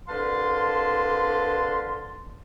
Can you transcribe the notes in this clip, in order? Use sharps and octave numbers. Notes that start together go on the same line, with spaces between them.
C2 D3 B4 F5 A5 C6